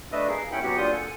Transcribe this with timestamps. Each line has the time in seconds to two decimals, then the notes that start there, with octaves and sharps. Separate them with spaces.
0.12 A3 D4 B4 D#5 E5
0.28 G#4 A#4 F5
0.52 D#2 C#4 E4 F#5 G5 B5
0.63 F#3 B3 F#4 G4 F#5
0.77 A#2 D4 F4 D#6 G6
0.92 A4 F#5 G#5